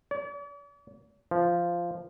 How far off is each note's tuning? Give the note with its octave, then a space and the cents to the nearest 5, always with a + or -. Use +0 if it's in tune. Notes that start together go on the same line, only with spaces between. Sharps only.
D5 -45
F3 -10